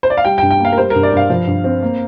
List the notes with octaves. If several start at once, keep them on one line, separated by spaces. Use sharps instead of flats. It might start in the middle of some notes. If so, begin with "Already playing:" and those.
C5
D5
F5
G3 G5
G5
G2
G5
A#3 F5
A#4
G3 C5
A#4
G2
D5
G2 F5
F3
G2
C4
A#3